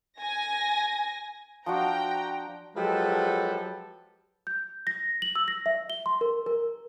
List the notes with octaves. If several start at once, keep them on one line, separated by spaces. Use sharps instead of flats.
G#5 A#6
F3 D4 F#4 G5 A#5
F3 F#3 G#3 G4 A4 B4
G6
A#6
F#7
E6
A#6
E5
G7
C6
A#4
A#4